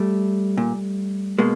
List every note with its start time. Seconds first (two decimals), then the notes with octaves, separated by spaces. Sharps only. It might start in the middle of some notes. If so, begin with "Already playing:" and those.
Already playing: G3 A3
0.57 A#2
1.38 B2 G#3 A#3